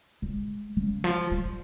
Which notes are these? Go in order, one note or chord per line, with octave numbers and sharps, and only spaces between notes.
G#3
C#3
F3
G3